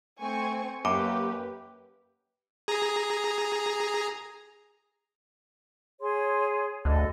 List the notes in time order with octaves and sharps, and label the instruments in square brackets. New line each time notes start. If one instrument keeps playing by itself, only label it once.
[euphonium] A3 [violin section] C4 G#5 C#6
[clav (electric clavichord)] F#2 [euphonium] A#3 [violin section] G4 B4 [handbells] D6
[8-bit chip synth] G#4 A#5
[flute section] G#4 C#5 C6
[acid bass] D2 [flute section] A4 D#5 A5